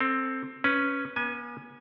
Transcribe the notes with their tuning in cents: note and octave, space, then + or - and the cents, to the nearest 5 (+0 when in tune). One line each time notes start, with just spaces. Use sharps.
C4 +10 A4 +25
C#4 +0 B4 +0
B3 -45 G#5 +0